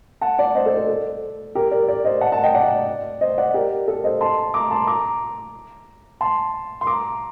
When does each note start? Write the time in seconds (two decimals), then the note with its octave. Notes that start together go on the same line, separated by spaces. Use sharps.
0.21 F#5 A5
0.38 D5 F#5
0.55 C5 D#5
0.66 A4 C5
0.77 A4 C5
0.88 A4
1.55 G4 A#4
1.71 A#4 D5
1.88 A#4 D5
2.05 C5 D#5
2.21 F#5 A5
2.32 F#5 A5
2.43 D#5 G5
2.54 D5 F#5
3.21 C5 D#5
3.38 D5 F#5
3.54 G4 A#4
3.88 A4
4.04 C5 D#5
4.21 A5 C6
4.54 A#5 D6
4.71 A5 C6
4.87 A#5 D6
6.21 A5 C6
6.81 C6
6.87 A#5 D6